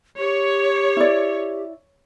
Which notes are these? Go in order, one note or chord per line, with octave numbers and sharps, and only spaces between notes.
G4 C#5
E4 D5